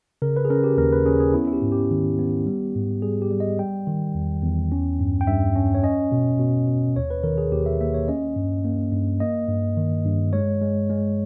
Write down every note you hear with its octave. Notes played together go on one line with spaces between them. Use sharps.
C#3 A#4
B4
G#4
C#4 A#4
G4
D#2 A#4
B4
C#4 G#4
G#4
B3 E4
E4
G4
G#2
G4
D#3
B3
G3
G#2
G3 G#4
G4
G3
D#5
G3 G5
D#3
E2
E2
C#4
G2
G5
G2 E5
C#4
C#5
C#4 D#5
B2
B2
B2
D#2 C#5
B4
D#3 A#4
G#4
D#2 G4
E5
A#3 E5
C#5
C#4 D#5
G2
A#3
G2
A#3 D#5
G2
D#3
G2
G#3 C#5
G#3
G#3